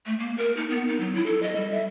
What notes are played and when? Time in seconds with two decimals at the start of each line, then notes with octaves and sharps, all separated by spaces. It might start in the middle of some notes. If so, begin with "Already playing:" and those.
0.06 A3
0.19 A#3
0.38 A#4
0.57 D#4
0.70 B3
0.88 D#4
1.00 F#3
1.15 E4
1.26 A4
1.43 D#5
1.56 G3
1.71 E5